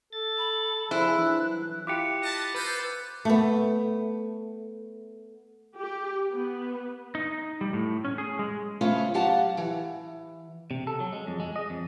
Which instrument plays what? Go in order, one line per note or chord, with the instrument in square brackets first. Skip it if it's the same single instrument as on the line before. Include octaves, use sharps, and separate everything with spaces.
[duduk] A4 [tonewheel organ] A6
[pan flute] B5
[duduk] F3 [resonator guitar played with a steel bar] E4 [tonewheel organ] G#4 C5 [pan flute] F#6
[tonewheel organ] E3 [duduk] D4
[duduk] F#3
[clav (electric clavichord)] E4 F4 G4 [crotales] D6 F#6 C#7
[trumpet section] B4 D#5 A5
[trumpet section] F4 A4 C5 [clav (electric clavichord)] B4
[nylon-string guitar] A3 B3
[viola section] G4
B3
[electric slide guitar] D#4
G3
A2
C#4
G#4
G#3
[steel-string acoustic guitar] C#3 A3 C#4 F4 B4 C5
F#3 G4 F5 F#5 A5
E3
[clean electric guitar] C3
A4
F#3
G#3
F2
G#3
D#5
F2